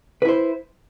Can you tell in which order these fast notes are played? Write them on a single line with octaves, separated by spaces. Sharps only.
B4 E4 C5